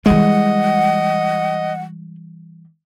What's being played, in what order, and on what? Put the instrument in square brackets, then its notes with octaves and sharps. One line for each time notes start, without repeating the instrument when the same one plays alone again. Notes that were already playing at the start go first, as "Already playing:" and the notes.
[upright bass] E3 G3 [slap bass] G#3 [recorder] D#5 [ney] F#5